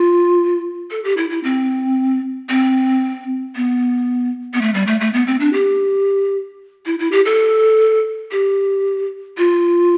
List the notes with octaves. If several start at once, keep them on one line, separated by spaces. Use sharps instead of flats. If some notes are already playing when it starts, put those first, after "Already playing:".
Already playing: F4
A4
G4
E4
E4
C4
C4
B3
B3
A3
G3
A3
A3
B3
C4
D4
G4
E4
E4
G4
A4
G4
F4